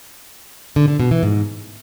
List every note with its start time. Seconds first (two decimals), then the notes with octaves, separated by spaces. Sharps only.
0.76 D3
0.88 D3
1.00 B2
1.11 E3
1.23 G#2